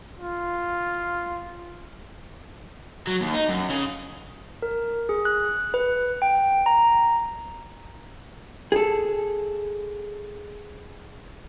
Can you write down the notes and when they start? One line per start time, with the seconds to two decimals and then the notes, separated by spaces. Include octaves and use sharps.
0.19 F4
3.07 F#3
3.21 D#2
3.34 D#4
3.49 F#2
3.70 C#3
4.62 A#4
5.09 G#4
5.25 F#6
5.74 B4
6.22 G5
6.66 A#5
8.72 G#4 A4